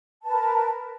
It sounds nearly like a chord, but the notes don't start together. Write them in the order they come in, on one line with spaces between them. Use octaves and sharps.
A5 B4 A#4